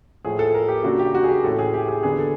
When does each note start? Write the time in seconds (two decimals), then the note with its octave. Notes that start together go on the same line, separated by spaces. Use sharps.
0.24 A2 F3 A3 G#4
0.39 A4
0.54 A#4
0.68 G4
0.84 C#3 F#3 A#3 D4 F#4
0.99 G4
1.14 F#4
1.24 G#4
1.29 G4
1.44 A2 E3 A3 C#4 A4
1.59 G#4
1.74 G4
1.88 G#4
2.03 D3 F#3 B3 D4 G#4
2.19 A4